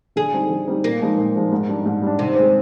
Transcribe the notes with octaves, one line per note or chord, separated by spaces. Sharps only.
D3 G#4
G3 C4 D#4
D3
G3 C4 D#4
A#2 A#3
F3 G#3 D#4
A#2
F3 G#3 D#4
G#2
G3 D4
G#2
G3 D4
C3 D#3
G#3 C4